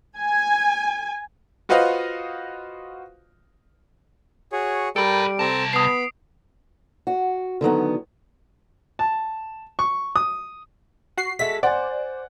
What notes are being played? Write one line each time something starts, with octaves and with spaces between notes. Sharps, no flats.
G#5
F4 F#4 B4 C5 D#5 F5
F#4 G#4 C#5
G3 A4 A#4 G5 A5 B5 D7
C2 C4 A4 A5 A#5
B3 B5 D#6 C7
F#4
D3 D#3 F#3 B3
A5
C#6
D#6
F#4 C7
G#3 F#4 A4 E5 B6
C5 D5 F#5 G#5